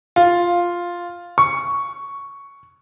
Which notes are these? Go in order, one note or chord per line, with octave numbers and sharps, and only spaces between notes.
F4
C#6